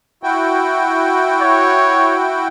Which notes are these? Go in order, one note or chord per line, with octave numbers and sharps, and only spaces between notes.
E4 F#4 G5
C#5